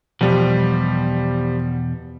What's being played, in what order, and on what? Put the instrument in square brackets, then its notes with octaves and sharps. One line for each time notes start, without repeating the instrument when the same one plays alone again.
[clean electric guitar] E2 B2 [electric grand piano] F3 G3